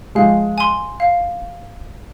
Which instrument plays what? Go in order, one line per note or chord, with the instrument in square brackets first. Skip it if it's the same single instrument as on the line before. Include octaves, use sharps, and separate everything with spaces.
[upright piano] F3 G#3 [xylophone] F5
[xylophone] G#5 C6
F5